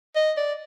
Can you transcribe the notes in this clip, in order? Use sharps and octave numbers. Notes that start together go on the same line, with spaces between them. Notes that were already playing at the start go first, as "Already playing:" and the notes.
D#5
D5